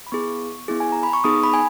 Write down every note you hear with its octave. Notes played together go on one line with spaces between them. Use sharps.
B5
B3 E4 G#4 C#6
B3 E4 G#4
G#5
A#5
B5
C#6
B3 D#4 G#4 D#6
B5
G#5